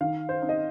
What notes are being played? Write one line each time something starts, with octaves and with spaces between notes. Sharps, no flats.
D#3 F5
C5
C4 D#4
D#5